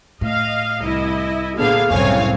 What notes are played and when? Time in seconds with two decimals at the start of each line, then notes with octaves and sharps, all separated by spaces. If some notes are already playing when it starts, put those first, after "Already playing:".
0.21 A2 D#5 F5
0.79 C2 E4 D#5
1.58 A#2 D3 B3 G#4 F5
1.90 C2 F#2 A2 C#3 C4 C#5 F5 G#5